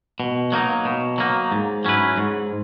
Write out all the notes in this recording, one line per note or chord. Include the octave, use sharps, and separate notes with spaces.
B2
F#3 A#3 D#4
B2
F#3 A#3 D#4
G#2
F#3 C#4 E4 B4
G#2